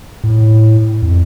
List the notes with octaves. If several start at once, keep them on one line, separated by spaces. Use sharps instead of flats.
A2
F2